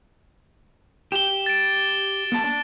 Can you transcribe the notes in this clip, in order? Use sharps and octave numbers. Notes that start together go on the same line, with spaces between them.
G4 E7 G7
A6 D7
A#3 A5
D4